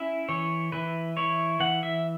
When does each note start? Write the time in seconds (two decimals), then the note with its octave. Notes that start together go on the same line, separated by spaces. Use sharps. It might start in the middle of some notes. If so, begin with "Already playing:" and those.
Already playing: C#4 E4 E5
0.29 E3 C#5
0.72 E3 B4
1.17 E4 C#5
1.60 E3 F#5
1.83 E5